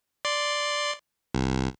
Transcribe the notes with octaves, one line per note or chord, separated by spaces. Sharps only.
D5 C6
C2